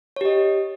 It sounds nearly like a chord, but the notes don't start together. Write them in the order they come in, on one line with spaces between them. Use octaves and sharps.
C#5 G4 D#5